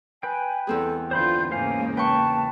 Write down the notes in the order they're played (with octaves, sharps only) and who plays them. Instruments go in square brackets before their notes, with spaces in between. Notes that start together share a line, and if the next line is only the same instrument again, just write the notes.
[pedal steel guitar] B4 G5 [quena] G#5
[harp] E2 C4 G#4 [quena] A4
[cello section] D3 F4 [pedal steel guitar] C5 B5 C6 [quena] G6
[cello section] G#2 C#3 A#3 [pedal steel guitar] A3 C5 F5 [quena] G#5
[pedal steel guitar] B4 [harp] G5 C#6 [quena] A5